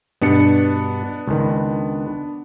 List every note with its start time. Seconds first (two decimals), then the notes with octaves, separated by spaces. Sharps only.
0.21 G2 B2 B3 D4 A5 C#7
1.27 C#2 D#3